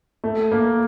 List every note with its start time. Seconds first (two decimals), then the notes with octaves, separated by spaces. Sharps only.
0.24 A3
0.52 A#3